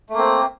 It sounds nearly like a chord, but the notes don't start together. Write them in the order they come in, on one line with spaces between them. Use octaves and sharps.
A3 A#3 C4